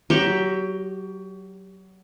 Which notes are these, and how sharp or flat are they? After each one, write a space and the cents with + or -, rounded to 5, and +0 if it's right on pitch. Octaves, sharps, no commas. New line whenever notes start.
F#3 +25 G4 +5 C#6 +0